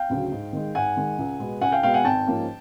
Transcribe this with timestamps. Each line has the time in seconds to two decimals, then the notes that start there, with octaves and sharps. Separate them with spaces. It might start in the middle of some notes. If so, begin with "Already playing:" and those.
Already playing: F5 G5
0.10 D2 C#3 F#3
0.31 G#2
0.53 D#3 G#3
0.75 G#2 F#5 G#5
0.97 D#3 G#3
1.18 C#2
1.40 B2 G#3 B3
1.61 C#2 F#5 G#5
1.72 F5 G5
1.83 B2 G#3 B3 F5 G5
1.94 F#5 G#5
2.05 G#1 G5 A5
2.27 G#2 F3 A#3 C#4